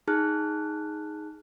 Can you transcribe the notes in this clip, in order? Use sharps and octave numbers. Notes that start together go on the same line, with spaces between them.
D#4 G#4 A5 F6 F#6